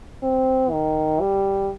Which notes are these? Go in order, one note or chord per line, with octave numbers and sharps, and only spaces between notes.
C4
D#3
G3